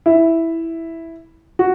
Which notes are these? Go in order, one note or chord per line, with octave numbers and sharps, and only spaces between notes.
E4
F#4